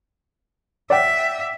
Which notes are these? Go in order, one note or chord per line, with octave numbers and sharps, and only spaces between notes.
D5 E5 F#5 G5